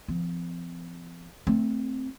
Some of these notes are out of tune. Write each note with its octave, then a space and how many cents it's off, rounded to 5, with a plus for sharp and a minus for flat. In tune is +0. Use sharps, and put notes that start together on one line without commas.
F3 -25 C4 -40
A3 +10 C4 +0